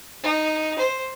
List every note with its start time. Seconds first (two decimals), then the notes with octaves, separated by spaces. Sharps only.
0.23 D#4
0.78 C5